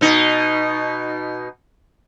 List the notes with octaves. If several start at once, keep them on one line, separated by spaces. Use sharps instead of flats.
B2 D#4